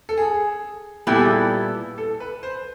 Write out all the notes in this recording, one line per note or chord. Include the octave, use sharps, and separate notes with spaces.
A4
G#4
A#2 G3 B3 E4 G4 A4
G#4
G4
A4
B4
C5